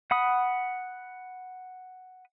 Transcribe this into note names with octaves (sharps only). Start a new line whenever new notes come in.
F#5 B5 D#6